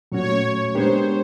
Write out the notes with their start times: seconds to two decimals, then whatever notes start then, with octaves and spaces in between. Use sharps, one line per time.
0.12 A#2 F#3 A3 C#4 F#4 C#5
0.74 G#3 B3 D4 G4 A#4 C5